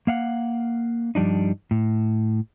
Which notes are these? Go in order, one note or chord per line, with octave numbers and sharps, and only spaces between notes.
A#3 F5 F#5
G2 F3 G3 D4 D#4
A2